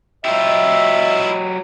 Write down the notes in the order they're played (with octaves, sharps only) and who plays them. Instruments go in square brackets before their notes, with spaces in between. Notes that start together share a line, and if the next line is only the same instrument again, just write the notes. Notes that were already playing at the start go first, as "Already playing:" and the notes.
[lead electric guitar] F#3 G4 [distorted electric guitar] E4 F4 [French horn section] D#5 [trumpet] E5